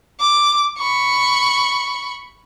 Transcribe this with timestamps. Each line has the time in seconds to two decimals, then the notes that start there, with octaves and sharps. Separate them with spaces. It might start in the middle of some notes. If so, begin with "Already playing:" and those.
0.20 D6
0.78 B5 C#6